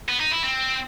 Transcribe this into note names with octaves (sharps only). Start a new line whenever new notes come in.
B3
D#4
E4
C4